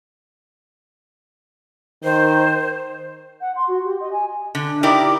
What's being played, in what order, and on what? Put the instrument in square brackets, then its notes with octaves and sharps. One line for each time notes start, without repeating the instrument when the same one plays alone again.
[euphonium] D#3 [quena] C5
[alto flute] F#5
C6
F#4
G4
D#5
G#5
[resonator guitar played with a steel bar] D3
D#4 E4 G4 A#4 D5